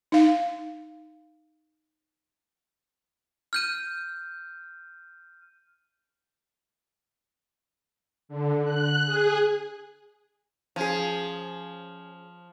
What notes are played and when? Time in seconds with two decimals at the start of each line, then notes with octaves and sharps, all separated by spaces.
0.12 D#4 F5
3.53 F6 G6 D#7
8.29 D3
8.64 F#6
9.05 G#4
10.76 F3 C#4 G#4